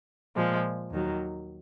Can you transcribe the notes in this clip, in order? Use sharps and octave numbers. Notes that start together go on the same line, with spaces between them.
A#2 F3 G#3
D#2 D#3 F#3